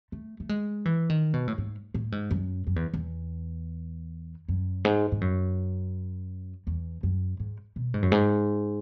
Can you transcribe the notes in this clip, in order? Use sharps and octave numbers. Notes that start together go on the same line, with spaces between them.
A3
A3
G#3
E3
D#3
B2
A2
G#2
A2
G#2
F#2
F#2
E2
E2
F#2
G#2
G#2
F#2
E2
F#2
G#2
B2
G#2
F#2
G#2